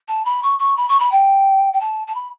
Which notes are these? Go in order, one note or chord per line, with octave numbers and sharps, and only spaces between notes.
A5
B5
C#6
C#6
B5
C#6
B5
G5
G5
A5
A5
B5